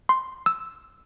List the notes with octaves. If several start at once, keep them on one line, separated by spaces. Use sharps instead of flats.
C6
E6